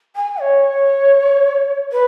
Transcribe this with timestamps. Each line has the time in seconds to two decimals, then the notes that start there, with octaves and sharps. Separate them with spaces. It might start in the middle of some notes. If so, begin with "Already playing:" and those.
0.16 G#5
0.41 C#5
1.92 B4